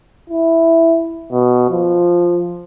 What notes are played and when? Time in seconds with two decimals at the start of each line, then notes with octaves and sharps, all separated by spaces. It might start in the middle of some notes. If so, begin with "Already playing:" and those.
0.30 E4
1.32 B2
1.70 F3